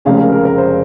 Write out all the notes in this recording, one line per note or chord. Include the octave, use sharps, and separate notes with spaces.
F1 F2 C#3 G#3 C#4 F5
A#4
A#4
A#4
C5